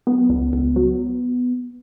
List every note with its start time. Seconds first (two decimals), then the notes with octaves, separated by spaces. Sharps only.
0.07 F#3 B3
0.30 C#2
0.53 C#2
0.76 F#3